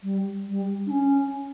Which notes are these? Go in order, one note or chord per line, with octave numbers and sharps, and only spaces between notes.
G3
G3
D4
C#4